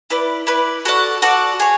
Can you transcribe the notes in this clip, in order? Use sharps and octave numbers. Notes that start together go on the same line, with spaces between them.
E4 B4 D5
E4 B4 D5
F#4 A4 D5 F#5
F#4 A4 D5 F#5
G#4 C#5